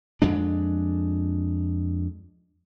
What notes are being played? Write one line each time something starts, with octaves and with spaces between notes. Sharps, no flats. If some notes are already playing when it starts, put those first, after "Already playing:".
F2 G#3 D4